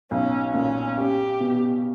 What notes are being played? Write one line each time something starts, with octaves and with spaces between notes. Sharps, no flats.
B1 C#4
A#2 C#4
C#4 G4
B2